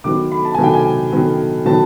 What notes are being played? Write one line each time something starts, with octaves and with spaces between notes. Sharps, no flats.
D#3 F#3 B3 D6
B5
A5
D#3 F#3 B3 G#5
G5
G#5
D#3 F#3 B3
D#3 F#3 B3 A5